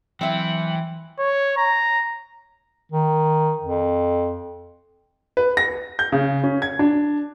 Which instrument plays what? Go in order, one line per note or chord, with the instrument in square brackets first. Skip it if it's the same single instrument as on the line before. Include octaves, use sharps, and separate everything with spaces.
[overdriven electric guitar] E3 [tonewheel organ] F#3 [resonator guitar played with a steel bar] C4 E5 [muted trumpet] G5
[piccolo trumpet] C#5
A#5
[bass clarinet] D#3
F2
[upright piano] B4
A#6
G6
C#3
C#4
G#6
D4